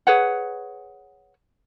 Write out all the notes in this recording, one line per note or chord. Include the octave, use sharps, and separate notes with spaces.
G#4 B4 C#5 F#5